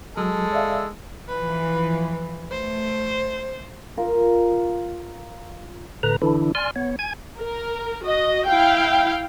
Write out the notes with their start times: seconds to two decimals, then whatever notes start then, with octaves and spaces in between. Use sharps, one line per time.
0.17 F#3 G#3 A4
0.53 D5 E5 F5
1.28 E3 F3 B4
2.51 A3 C5
3.97 F4 A#4
6.03 A2 D3 B4 A#5
6.22 D3 E3 D4 E4
6.55 D5 G#5 C6 F6
6.76 B3 C#5
6.99 G#5 G#6
7.39 A#4
8.05 F#4 D#5
8.47 E4 F5 G5